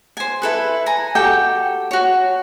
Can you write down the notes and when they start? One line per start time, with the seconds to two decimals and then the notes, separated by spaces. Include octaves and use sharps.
0.17 C5 G#5
0.42 E4 A4 B4
0.86 G#5 A#5
1.15 F#4 G4 A4 G5
1.91 F#4 C#5